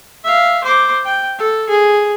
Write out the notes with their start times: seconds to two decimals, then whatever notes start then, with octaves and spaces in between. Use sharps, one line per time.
0.24 E5 F5
0.64 C5 D6
1.05 G5
1.39 A4
1.69 G#4